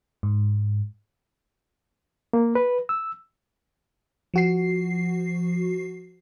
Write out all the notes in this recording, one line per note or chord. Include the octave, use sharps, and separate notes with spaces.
G#2
A#3
B4
E6
F3 F#4 C7